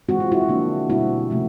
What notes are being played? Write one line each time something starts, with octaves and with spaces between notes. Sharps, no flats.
E3 G#3 C4 F#4
F4
E4 F#4
D3 F3 A#3 D4
B2 G3 C4 E4 F#4
C3 F3 A3 C#4